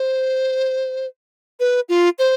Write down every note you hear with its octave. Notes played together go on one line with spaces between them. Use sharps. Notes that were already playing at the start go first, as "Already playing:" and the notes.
Already playing: C5
B4
F4
C5